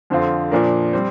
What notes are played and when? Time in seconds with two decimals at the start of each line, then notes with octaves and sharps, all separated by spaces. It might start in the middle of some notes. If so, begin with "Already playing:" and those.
0.10 F2 D3 F3 C4 F4
0.51 A#2 F3 D4 A#4
0.93 G3 C4